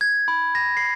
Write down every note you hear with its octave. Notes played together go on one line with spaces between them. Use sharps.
G#6
B5
A#6
C7